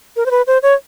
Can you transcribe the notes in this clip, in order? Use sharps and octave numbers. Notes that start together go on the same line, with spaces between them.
A#4
C5
B4
C5
C#5